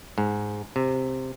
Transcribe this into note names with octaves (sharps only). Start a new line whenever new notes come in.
G#2
C3